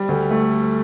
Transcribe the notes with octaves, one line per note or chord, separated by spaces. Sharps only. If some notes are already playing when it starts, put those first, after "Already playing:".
Already playing: G3
D2
A3